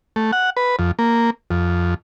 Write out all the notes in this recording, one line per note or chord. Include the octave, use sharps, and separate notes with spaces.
A3
F#5
B4
F2
A#3
F2